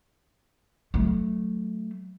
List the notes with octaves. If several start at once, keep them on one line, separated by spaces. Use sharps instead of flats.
F#3 A3